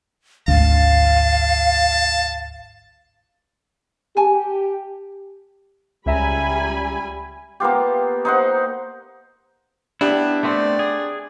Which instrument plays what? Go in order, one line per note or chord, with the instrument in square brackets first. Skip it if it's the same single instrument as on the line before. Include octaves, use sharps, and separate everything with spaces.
[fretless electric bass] G#1 D2 [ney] F5 [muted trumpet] A5
[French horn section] G4 [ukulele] G#5 A5
[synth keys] C#2 E5 A#5 [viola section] G3 G#5 B5
[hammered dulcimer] A#3 B3 F4 G4
D#4 C5 F#5
[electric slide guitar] B3 E4 [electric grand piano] D4 G4
[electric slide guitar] A3 B3 C4 [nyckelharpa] D5
[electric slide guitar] G#4